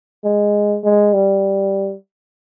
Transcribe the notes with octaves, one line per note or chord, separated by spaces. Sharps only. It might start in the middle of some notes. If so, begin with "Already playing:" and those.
G#3
G#3
G3